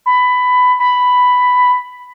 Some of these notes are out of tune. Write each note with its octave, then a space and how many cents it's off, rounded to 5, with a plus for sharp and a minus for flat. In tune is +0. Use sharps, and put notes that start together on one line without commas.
B5 +15
B5 +5